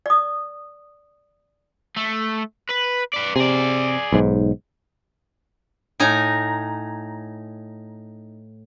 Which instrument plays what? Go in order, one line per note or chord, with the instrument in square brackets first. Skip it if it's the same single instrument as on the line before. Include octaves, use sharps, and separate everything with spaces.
[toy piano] D5 D#6
[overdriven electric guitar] A3
B4
B4 D5
[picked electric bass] C3 [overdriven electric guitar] G#4 D5
[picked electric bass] B1 G#2
[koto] A2 D#4 G#5 A#5